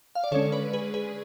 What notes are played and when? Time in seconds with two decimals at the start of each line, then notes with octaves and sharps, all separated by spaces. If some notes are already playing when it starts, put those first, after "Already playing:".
0.15 F5
0.24 D5
0.31 D3 G#3 C#4 A4 C#5
0.52 B4 D5
0.73 G#4 B4
0.94 G#4 B4